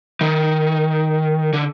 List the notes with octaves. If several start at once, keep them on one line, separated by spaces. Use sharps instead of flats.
D#3
D3